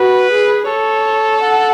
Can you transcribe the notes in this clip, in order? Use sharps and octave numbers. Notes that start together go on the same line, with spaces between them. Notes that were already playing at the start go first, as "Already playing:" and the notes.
Already playing: F#4 B4
G#4
A4 C#5
F#5